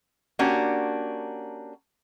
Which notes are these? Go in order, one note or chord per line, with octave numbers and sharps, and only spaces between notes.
A#3 C#4 D4 F#4 G4